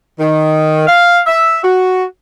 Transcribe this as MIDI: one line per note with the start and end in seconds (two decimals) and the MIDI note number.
0.20 0.86 51
0.88 1.20 77
1.27 1.62 76
1.64 2.04 66